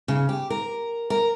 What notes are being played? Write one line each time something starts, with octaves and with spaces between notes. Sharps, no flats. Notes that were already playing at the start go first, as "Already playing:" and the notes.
C#3
G4
A#4
A#4